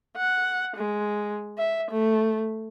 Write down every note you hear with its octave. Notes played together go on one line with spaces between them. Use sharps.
F#5
G#3
E5
A3